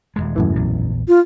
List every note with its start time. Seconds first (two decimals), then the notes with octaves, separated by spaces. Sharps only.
0.16 D#1 C2 G#3
0.36 F#2 A2 E3
0.55 A#1 E2
1.08 F4